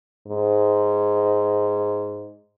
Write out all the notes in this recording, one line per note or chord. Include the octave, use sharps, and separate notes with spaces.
G#2